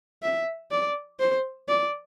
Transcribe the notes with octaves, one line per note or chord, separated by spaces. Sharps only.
E5
D5
C5
D5